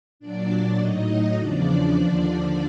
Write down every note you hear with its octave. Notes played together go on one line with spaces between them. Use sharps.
A#2 F#3 D4 D5
A2 F#3 D#4 D#5
D#4 D#5
E2 C#3 F3 D4 D5
D#2 D3 F3